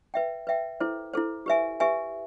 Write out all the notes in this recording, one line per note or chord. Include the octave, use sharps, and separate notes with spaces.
B4 E5 G5
B4 E5 G5
E4 A4 C5
E4 A4 C5
G4 B4 E5 G#5
G4 B4 E5 G#5